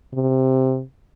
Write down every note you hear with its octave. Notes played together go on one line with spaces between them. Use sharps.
C3